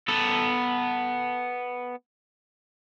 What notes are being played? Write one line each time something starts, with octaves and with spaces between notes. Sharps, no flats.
B3 A4